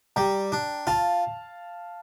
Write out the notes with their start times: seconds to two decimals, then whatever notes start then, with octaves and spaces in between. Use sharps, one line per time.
0.16 G3 G5 A#5
0.52 D4
0.87 F4 F5 A5